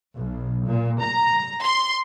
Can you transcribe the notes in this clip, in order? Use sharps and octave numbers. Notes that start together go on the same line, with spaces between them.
B1
A#2
A#5
C6